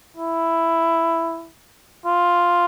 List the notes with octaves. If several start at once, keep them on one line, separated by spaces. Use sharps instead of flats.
E4
F4